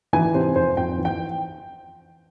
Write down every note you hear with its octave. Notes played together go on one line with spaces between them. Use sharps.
E3 G#5
C3 C5
F2 C5
F2 G5
E3
G5